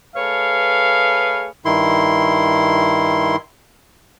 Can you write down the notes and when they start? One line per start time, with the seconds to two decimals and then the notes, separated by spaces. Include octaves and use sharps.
0.17 A3 G#4 B4 C#5 F5
1.65 G2 D#3 E4 C6